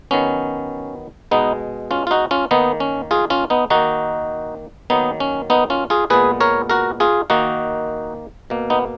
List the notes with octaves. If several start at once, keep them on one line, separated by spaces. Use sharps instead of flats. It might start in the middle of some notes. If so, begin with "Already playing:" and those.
D#3 F#3 B3 C#4
B2 G#3 B3 D#4
C#4 F4
F4
D#4 F#4
C#4 F4
D#3 A#3 B3 D#4
C#4
F4 G#4
C#4 F4
B3 D#4
D#3 A#3 D#4 F#4
D#3 F#3 A#3 B3 D#4
C#4
B3 D#4
C#4 F4
F4 G#4
A#2 G#3 B3 G#4 B4
A#4 C#5
F#4 A#4
F4 G#4
D#3 A#3 D#4 F#4
B2 A#3
B3 D#4